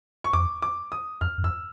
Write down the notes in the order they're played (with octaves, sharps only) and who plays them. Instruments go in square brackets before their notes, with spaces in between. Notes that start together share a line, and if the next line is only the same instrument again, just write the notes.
[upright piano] C#6
[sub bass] F2 [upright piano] D6
[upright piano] D6
D#6
[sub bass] F2 [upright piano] F6
[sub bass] F#2
[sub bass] F2 [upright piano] E6